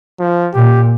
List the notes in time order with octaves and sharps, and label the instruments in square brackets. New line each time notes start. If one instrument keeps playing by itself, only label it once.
[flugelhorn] F3
[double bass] A#2 [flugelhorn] G4